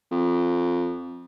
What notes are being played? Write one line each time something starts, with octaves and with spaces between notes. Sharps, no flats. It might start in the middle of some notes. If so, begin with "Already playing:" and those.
F2